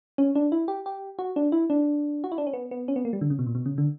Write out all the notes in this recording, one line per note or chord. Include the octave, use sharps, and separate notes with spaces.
C#4
D4
E4
G4
G4
F#4
D4
E4
D4
F#4
E4
D4
C#4
B3
B3
C#4
B3
A#3
G3
D3
C#3
B2
A#2
B2
C#3
D3